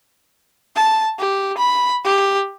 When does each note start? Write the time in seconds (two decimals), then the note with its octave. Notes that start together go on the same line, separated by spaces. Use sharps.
0.76 A5
1.19 G4
1.58 B5
2.04 G4